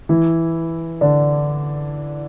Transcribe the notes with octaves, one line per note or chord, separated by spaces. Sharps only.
E3 E4
D3 D4